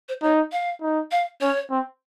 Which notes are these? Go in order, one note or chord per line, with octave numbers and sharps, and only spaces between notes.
C5
D#4 C#5
F5
D#4
F5
C#4 C#5
C4